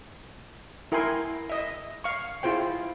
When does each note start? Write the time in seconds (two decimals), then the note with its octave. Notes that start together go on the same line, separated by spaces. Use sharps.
0.92 E4 A#4 G5 G#5 C6
1.50 D#5 E5
2.04 F5 C#6
2.43 E4 F4 G#4 C5 G5